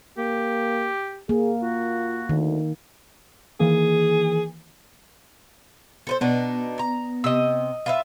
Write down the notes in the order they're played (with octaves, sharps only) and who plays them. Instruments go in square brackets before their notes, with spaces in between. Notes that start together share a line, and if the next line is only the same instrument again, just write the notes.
[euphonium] A#3 [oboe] G4
[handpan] A#3 [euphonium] G#4
[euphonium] F4 [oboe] F#4
[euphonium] D2 [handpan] D#3
[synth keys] D#3 E3 A#3 [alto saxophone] G#4
[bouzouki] A4 B4 C5
[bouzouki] B2 D4 D#4 [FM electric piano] B3
[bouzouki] A#5
[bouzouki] C3 [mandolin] D#5 E6
[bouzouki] F4 B4 E5